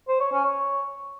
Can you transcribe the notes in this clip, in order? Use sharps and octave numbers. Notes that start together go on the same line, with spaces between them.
C5
C#5
C#4
C#5